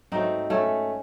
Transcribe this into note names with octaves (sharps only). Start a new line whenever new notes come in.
G#2 F#3 A3 C4 D#4
A3 C#4